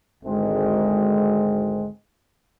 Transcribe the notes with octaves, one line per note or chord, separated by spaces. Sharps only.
G#1 D2 G#3 C4